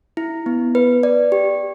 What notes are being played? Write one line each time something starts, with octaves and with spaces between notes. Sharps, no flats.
E4
B3
B4
D5
G4